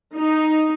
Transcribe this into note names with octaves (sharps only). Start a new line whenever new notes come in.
D#4